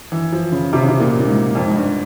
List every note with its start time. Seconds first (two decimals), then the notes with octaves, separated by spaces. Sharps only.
0.12 E3
0.32 F3
0.52 C#3
0.73 C3
0.81 C#3
0.88 C3
1.00 A#2
1.20 A#2
1.27 G#2
1.55 F2
1.67 G#2
1.75 G2